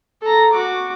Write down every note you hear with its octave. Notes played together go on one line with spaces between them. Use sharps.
A4 A#5
F#4 D6